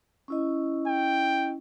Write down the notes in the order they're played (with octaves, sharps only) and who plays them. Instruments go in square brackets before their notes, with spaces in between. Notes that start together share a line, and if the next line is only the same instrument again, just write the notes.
[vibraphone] C#4 E4 D#5
[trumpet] G5